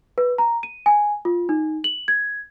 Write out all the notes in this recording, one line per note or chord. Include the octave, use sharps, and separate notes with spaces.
B4
A#5
D#7
G#5
F4
D#4
F#7
G#6